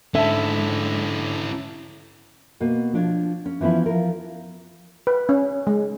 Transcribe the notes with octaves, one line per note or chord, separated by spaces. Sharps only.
G#2 D3 G#3 C#4 E4 E5 A5
B2 A#3
F3 D4 C#5
C#4
E3 F3 B3 C#4 E4
F3 A#4
B4
C#4
G#3